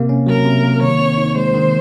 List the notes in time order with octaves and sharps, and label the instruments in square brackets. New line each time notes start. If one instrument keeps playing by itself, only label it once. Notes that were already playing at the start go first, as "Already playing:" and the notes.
Already playing: [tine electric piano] C3 A#3
C#4
[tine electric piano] F#3 [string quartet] A#4
[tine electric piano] C3
A#3
[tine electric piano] D#3 [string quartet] C#5
[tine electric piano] C4
D#4
[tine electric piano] G#3 [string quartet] C5
[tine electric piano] D#3